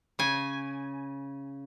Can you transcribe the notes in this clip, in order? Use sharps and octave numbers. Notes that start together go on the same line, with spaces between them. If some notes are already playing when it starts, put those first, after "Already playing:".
C#3 G#5